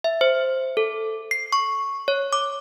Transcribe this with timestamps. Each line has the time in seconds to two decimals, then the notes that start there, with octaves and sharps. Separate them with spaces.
0.04 E5
0.21 C5
0.77 A4
1.31 C7
1.53 C#6
2.08 C#5
2.33 D6